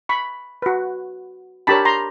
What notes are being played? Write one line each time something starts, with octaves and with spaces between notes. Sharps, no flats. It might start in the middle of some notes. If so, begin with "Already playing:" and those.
B5 C#6
F#4 B4
D4 G4 A#4 C#5 A5 B5
A#5 C6